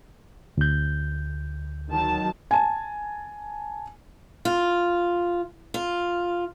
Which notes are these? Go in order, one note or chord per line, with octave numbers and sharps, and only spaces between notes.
D2 G6
D#3 F#3 A5
G#5 A5
F4
F4